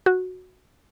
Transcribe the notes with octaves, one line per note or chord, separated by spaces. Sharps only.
F#4